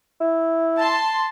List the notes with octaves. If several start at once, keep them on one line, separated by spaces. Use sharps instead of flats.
E4
A5 C6